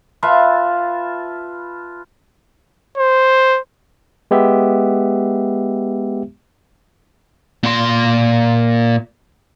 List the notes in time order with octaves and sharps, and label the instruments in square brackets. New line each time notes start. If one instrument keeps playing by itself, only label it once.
[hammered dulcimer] F4 B4 E5 A5
[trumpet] C5
[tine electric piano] G#3 B3 G4 E5
[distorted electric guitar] A#2 C6